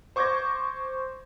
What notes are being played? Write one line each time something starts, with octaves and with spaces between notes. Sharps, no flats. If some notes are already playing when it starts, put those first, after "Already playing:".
C5 C#6 D6 G6 G#6 A#6